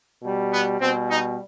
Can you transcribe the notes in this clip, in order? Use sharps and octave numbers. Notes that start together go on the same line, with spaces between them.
B2 G3
B3
B2 G3 C4
D#4